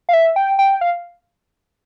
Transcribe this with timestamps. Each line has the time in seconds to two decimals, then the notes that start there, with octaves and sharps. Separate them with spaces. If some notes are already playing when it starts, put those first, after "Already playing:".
0.09 F5
0.13 E5
0.36 G5
0.59 G5
0.81 F5